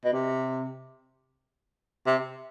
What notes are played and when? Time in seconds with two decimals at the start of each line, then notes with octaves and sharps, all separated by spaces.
0.05 B2
0.13 C3
2.07 C3